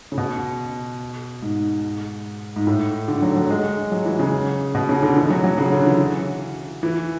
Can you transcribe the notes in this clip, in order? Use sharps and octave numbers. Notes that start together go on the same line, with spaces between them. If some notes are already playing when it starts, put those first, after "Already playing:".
C#3
B2
G#2
G#2
A2
D3
F#3
F#3
G#3
F#3
E3
C#3
B2
C#3
D3
E3
F#3
F#3
C#3
D3
E3
E3